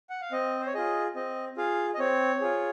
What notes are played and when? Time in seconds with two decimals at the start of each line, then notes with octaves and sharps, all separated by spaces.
0.10 F#5
0.21 F5
0.32 C4 D#5
0.60 C5
0.66 C#5
0.74 F4 G#4 D#5
1.15 C4 D#5
1.57 F4 G#4 F5
1.94 D#5
1.99 C4 C#5
2.41 F4 G#4